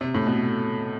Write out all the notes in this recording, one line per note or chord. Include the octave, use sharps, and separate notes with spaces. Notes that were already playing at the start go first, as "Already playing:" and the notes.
C3
A2
B2